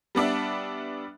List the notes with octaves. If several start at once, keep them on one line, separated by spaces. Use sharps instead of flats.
G3 B3 D4 E5